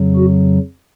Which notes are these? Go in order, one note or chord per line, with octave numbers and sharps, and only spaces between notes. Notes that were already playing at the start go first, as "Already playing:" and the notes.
Already playing: F2 C#3 F#3
F#4